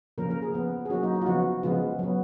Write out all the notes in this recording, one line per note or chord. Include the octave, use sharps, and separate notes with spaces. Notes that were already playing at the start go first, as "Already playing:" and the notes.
C#3 F3 A#3 C#4 A#4
A#4
G#4
F3 B3
G#4
F#3 A#3 C#4 F#4
D#4
D#4
F4
C#3 F3 B3 F#4
C#3 F3 G#3 B3 F4
F#3 B3